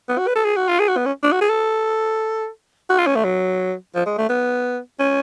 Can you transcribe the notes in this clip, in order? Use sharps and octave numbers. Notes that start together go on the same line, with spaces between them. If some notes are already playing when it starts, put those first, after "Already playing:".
B3
F#4
B4
A4
G#4
F#4
F4
G#4
F#4
B3
C#4
D4
F#4
G#4
A4
F#4
F4
C#4
A3
F#3
F3
G#3
A3
B3
C#4